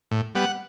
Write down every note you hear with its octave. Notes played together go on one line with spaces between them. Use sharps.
A2
G3 B3 F#5